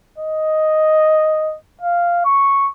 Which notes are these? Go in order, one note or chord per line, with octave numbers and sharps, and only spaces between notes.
D#5
F5
C#6